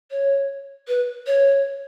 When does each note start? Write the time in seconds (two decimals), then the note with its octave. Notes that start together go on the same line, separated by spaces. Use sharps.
0.11 C#5
0.88 B4
1.27 C#5